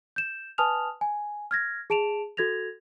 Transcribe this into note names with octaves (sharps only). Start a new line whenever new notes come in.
G6 E7
B4 G#5 A5 D#6 F6 F7
G#5
F6 G#6 A#6
G#4 A5 D7 E7 F7
F#4 A4 G#6 A#6 F7